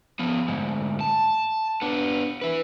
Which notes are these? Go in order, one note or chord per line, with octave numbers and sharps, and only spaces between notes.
F3 B3
D2 G#2
A5
B3 D4
E4 B4